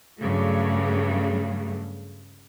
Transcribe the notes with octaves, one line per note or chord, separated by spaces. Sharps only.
G2 C#3 F#3 A3